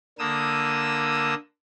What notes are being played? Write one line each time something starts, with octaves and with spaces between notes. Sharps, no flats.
D3 A#3 D#6 E6